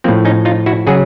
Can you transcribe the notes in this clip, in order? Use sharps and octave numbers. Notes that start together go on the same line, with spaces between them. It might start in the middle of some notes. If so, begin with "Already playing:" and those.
A2 F3 A#3 C4
C#4 D#4
D#4 F4
E4 F#4
C#3 F#3 F#4 G#4